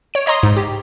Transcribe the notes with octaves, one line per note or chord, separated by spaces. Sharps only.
C#5 D7
C#5 D#5 A#5 C6 D#6
G#2
G4